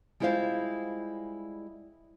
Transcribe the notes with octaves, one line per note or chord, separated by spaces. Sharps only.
G3 G#3 E4 F4 C5 F5